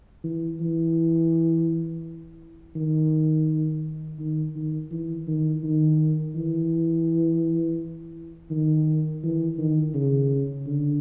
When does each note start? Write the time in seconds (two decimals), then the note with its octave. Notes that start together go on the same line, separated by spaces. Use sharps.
0.24 E3
0.60 E3
2.76 D#3
4.19 D#3
4.55 D#3
4.91 E3
5.27 D#3
5.63 D#3
6.35 E3
8.50 D#3
9.23 E3
9.58 D#3
9.94 C#3
10.66 D3